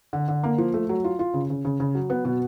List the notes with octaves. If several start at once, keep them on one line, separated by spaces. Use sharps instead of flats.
D3
D3
A#3
F3
A3
F#3
F4
F4
C#3
C#3
C#3
C#3
F#3
B3
B2